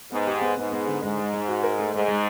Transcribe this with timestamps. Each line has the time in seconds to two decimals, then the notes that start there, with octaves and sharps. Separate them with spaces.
0.12 G#2 B3
0.27 G4
0.41 B3
0.57 G#2 B3
0.72 B3
0.87 D3
1.02 G#2 G#3
1.18 G#3
1.34 G#3
1.49 F#4
1.63 A#4
1.79 A3
1.94 G#2 G#3
2.08 G#3